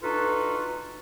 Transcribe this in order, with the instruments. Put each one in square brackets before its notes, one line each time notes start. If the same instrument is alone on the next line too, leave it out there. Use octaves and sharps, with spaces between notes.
[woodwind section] D4 D#4 F4 F#4 A4 B4